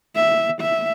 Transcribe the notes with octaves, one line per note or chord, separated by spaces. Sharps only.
E5
E5